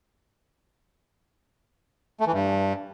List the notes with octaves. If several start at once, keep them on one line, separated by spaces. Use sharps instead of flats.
A3
E3
G2